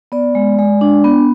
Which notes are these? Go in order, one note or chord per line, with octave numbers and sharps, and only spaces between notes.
B3 D5
G#3
G#3
D4
B3